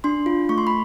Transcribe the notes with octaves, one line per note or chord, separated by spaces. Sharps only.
D4 C6
F4
A3 C#6
C6
B5